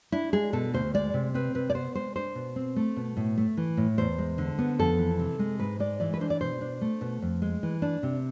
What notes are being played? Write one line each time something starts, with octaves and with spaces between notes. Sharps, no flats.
D4 E4
G#3 G#4
B2 A4
D2 C5
G#3 D5
C3
C4 B4
C3 B4
D5
B3 C5
G#3 C5
D4 C5
B2
C4
A3
B2
A2
A3
E3
A2
E2 C5
G#3
D3
B3
F2 A4
E3
C3
G#3
G#2 B4
G#3 D5
E3 D5
B4
D4 C5
D5
B2 C5
D4
A3
B2
F2
G#3
E3
D4
C3